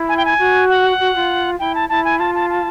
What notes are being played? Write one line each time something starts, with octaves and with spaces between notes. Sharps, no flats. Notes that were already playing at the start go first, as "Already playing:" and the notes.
Already playing: E4
G#5
G5
G#5
F#4
F#5
F#4
F4
E4 G5
A5
E4 A5
G#5
F4 A5
A5
A5